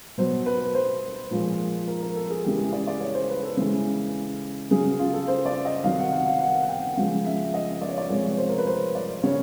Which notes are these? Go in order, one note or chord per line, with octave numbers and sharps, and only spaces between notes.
B2 F#3 C5
B4
C5
A#2 F3 G#3
A#4
A#4
A4
G#4
C#3 E3 G#3 G4
G#4
D5
D5
C#5
C5
B4
A4
C#3 E3 G#3
C#3 F#3 G#4
F4
A4
C5
D5
D#5
C3 D#3 F#3 F5
F#5
F#5
F5
F#5
F#5
G5
C#3 F3 G#3 F5
E5
D#5
D5
C#5
D5
C3 F3 G#3 C#5
C#5
C5
A#4
B4
C5
D5
C#3 C#5